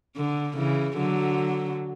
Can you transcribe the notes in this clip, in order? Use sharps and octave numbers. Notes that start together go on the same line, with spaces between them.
D3
C#3 E3
D3 F#3